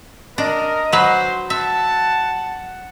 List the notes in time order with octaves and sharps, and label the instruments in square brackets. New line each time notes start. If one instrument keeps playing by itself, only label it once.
[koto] D4 [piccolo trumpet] A#4 [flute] D#5
[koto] F#3 B4 [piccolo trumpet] C5
[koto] E5 [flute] F#5 [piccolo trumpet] A5